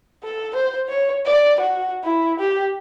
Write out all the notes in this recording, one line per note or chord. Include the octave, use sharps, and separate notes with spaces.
A4
C5
C#5
D5
F#4
E4
G4